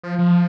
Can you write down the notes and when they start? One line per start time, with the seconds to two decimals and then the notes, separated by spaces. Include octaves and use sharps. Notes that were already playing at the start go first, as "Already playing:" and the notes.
0.03 F3
0.19 F3